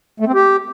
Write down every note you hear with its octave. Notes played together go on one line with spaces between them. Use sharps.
A3
C4
G4